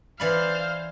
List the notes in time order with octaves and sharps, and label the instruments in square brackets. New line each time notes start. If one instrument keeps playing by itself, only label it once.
[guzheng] E3 D5 B5 [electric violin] C5 F5